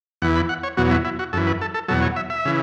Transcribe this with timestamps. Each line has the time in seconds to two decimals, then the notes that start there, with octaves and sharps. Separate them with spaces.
0.22 E2 E3 F#5
0.36 B5
0.49 F#5
0.63 C#5
0.77 E2 B2 F#3 F#4
0.91 E4
1.05 E4
1.19 F#4
1.33 F#2 E3 A4
1.47 B4
1.61 A4
1.74 A4
1.88 E2 B2 F#3 A4
2.02 C#5
2.16 E5
2.30 E5
2.45 C#3 E3